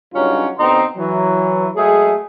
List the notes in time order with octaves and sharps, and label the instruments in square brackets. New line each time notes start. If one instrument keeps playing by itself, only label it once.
[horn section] G2 C#3 F#3 C#4 D#4 F4
B2 D3 C4 D#4 A#5 C6
E3 F#3
F#3 G#3 A3 G#4